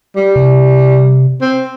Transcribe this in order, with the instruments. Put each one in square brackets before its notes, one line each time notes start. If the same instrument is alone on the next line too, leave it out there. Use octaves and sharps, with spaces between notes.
[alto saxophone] G3
[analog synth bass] C3
[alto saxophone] C4